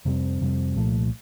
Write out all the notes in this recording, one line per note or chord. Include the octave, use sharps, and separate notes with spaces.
F2 C3 G3 C4
F2 C3 G3 C4
C2 A#2 F3 A3